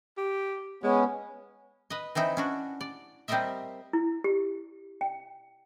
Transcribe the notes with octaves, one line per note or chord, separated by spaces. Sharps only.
G4
G#3 B3 C#4
B4 D#5
E3 C4 D#4 E4
C#4 D4 F#4
D5
G3 C4 F4 A#4 D#5 E5
E4
G4
G5